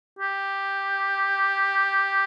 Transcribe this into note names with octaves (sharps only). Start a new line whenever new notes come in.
G4